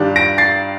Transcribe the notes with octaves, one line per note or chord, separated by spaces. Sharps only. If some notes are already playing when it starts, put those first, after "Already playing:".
Already playing: G2 D#3 G3 D4 F4
A#6 D7
A6 C7